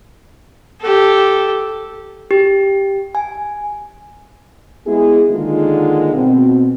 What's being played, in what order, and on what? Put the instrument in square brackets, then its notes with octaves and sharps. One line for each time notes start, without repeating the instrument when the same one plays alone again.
[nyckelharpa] G4 A4
[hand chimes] G4
G#5
[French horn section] G#3 B3 E4 G#4
D3 D#3 G#3 A#3 D#4 F4
B2 C4